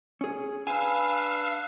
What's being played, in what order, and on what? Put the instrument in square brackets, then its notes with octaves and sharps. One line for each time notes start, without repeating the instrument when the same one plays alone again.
[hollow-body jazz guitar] C#4 G#4
[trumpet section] D4 B4 [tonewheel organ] F5 E6 [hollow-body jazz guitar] G#5